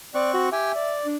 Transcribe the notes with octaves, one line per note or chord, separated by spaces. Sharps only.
C4 D5 C#6 F#6
F#4
G4 E5 G5 G#5
D5
D4